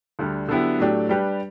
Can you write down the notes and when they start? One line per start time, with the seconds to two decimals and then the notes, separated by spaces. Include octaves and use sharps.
0.19 D2 D3 G3
0.49 D3 F#3 B3 E4 G4
0.79 A2 F#3 A3 D4 G4
1.09 G3 D4 G4 B4